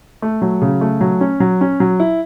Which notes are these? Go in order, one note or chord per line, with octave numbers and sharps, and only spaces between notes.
A3
F#3
C#3
A3
F#3
C#4
F#3
C#4
F#3
E4